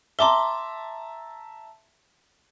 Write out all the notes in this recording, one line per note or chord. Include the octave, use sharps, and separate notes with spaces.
E5 A5 A#5 C6 D6 G7